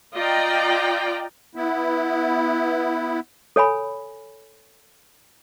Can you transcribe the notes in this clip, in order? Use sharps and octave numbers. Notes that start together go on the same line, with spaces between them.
F4 D5 D#5 G5 A#5
B3 E4
A4 C#5 G#5 B5